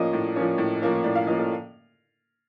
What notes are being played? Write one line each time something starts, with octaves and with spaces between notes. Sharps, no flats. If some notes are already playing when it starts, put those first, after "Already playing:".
Already playing: A2 F3 A#3 C#4 D5 D#5
A2
F3 A#3 C#4
A2
F3 A#3 C#4
A2 D5
F5
F3 A#3 C#4 D#5
A4